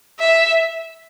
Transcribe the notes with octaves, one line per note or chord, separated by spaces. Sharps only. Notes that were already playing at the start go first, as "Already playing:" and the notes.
E5